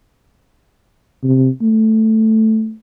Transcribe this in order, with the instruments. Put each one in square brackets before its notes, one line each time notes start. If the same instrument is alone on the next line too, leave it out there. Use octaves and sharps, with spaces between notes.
[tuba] C3
A3